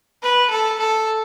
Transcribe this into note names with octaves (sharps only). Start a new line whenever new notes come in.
B4
A4
A4